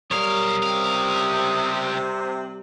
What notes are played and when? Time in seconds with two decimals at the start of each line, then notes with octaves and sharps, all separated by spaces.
0.11 B1 G3 A#4 C#5 F5 D#6
0.63 C#2 C3 F5